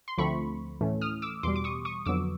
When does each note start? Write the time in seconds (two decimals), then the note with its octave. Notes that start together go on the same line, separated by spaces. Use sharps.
0.08 C6
0.18 D2 D3 F3 A3 C4 B5 C#6
0.81 A2 E3 A3 C#4
1.01 D#6 F6
1.22 D6 E6
1.43 E2 B2 G3 C6 D6
1.56 D6
1.64 C#6 D#6
1.85 C#6 D#6
2.06 F2 D3 F#3 B3 D6 E6